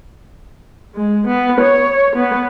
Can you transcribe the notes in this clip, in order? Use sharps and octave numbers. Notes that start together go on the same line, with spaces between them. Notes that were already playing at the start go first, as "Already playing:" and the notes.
G#3
B3
C#5
B3